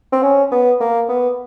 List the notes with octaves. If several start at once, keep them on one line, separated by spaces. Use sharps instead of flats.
C4
C#4
B3
A#3
B3